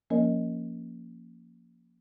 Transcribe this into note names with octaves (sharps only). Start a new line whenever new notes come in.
F3 A#3 C#4 A#4 C#5 D#5